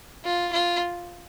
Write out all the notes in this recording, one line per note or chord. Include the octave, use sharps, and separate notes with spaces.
F4
F4